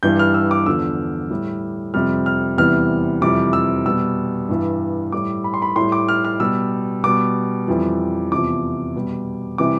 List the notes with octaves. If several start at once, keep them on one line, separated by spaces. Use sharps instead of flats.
G2 E3 G3 G6
F6
E6
D6
E2 D3 F3 E6
A2 G3
F2 C3 G3 F6
F6
E2 C3 E3 G3 F6
F2 C3 E3 G3 D6
E6
B2 G3 E6
G2 E3 G3
A2 G3 D6
B5
C6
B5
A2 C6
G3
D6
F6
F6
B2 G3 E6
B2 G3 D6
F2 E3 G3
E2 C3 F3 D6
B2 G3
C3 E3 G3 D6